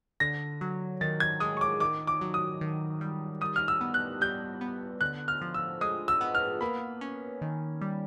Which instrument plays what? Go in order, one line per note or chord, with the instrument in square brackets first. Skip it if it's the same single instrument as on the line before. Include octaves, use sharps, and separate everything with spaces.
[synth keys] D3 [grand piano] A#6
[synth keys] F#3
[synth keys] D#3 [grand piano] A6
[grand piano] G#6
[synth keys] G#3 [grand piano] D#6
[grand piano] C#6
D6
[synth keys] D#3 [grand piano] D6
[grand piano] D6
[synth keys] F#3
[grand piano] D#6
[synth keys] D#3
G3
[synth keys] G3 [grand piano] D#6
[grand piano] F6
E6
[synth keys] B3
[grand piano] F#6
[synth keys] G3 [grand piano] G6
[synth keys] B3
[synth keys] D3 [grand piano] F#6
[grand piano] F6
[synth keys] F3
[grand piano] E6
[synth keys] G#3 [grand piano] D#6
[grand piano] E6
[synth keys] B3
[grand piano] F6
[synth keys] A#3 [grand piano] B5
[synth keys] C#4
D#3
G3